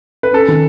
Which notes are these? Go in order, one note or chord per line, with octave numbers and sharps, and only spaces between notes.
B4
C#4 A4
D#3